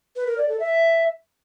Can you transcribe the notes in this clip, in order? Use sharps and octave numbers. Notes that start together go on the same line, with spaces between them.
B4
A#4
D5
A4
E5